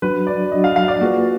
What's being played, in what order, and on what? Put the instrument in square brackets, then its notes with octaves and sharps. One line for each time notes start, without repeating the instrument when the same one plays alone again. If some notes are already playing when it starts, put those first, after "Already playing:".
[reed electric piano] F#3 D4 F#4 [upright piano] B4
[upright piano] D5
[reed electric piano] F#3 D4 F#4 [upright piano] D#5
[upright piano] F5
F5
D5
[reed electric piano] A#3 F4 G#4 B4 [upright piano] F#4